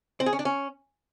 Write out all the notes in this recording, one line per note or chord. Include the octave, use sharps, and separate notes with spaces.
C4
G#4
C#4
D4
C#4